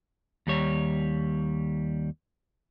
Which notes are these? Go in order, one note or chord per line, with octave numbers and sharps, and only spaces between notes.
D#2 G3 C#5